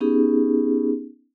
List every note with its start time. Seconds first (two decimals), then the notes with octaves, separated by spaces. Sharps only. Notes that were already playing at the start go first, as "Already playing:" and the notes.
0.01 B3 C#4 D#4 G4 G#4